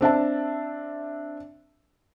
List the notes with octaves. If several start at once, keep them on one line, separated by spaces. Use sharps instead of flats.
C4 D4 E5 A5